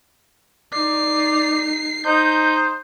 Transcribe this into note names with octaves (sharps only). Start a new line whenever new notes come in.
D#4 D5 C7
D#4 C5 G6